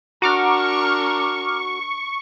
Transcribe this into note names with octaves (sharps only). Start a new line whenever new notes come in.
D4 F#4 A#4 A#5 C#6 D6 F6